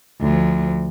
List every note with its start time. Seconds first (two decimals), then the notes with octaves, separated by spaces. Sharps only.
0.21 D2 F3